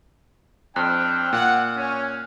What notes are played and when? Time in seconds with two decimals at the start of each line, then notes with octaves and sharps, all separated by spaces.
0.76 F2 C4 D4 G5 F6 F#6
1.33 A#2 F#5
1.76 C#4